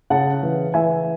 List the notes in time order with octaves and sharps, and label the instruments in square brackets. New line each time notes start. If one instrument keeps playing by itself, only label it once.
[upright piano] C#3 F#5 A5
E3
E3 E5 G#5